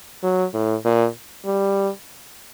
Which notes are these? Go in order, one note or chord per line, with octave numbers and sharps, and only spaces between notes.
F#3
A2
A#2
G3